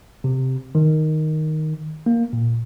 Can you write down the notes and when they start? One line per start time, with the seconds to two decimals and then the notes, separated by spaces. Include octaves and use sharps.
0.24 C3
0.75 D#3
2.06 A#3
2.33 A#2